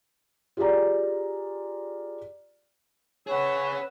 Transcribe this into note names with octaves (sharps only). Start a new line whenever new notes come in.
F4 G4 G#4 D5 A#5
C#4 G#4 B4 C#5 F#5 E6